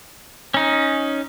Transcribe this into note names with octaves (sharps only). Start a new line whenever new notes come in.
C#4 D#4